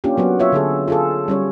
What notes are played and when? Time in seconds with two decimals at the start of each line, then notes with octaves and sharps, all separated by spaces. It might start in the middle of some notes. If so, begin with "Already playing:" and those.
0.04 A#3 C#4 D4 F4 G4
0.17 F#3 B3 F#4
0.40 F4 C#5 E5
0.52 D3 G#4 A4
0.88 F4 G#4 A4
1.28 G3 C#4 C#5